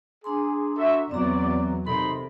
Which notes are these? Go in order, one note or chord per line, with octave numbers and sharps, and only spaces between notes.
D4 G#4 A#5 C6
F#4 A4 E5
E2 F#3 C4 D5 A#5
C3 D#4 A4 A#4 D5 B5 C6